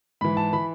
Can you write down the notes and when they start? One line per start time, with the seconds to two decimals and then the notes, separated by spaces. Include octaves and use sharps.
0.21 G#2 E3 B5
0.37 A5
0.53 E3 B5